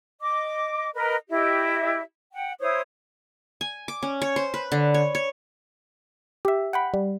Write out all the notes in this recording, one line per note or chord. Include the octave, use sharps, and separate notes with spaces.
D#5 D6
A#4 B4 D#5
E4 G4 D#5 E5
F#5 G5
E4 C5 C#5 D#6
G#5
D6
C#4
C#5
C5
B4
D3
C#5
C#5
G4 E5
F#5 G5 B5
G3